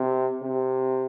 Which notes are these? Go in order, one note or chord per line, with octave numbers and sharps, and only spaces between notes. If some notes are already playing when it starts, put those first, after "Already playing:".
Already playing: C3
C3